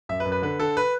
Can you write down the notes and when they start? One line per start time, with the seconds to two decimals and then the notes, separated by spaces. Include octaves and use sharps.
0.09 F#2 E5
0.20 B4
0.25 F#2
0.32 B4
0.42 D3 B4
0.60 D3 A4
0.77 B4